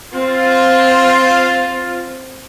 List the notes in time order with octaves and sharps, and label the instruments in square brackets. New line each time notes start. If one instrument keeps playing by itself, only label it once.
[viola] C4 [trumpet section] F4